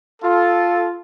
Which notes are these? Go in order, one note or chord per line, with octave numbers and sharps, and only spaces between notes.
F4 A4